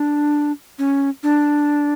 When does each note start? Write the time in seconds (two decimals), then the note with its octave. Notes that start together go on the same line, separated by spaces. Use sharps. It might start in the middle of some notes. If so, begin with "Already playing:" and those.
Already playing: D4
0.79 C#4
1.23 D4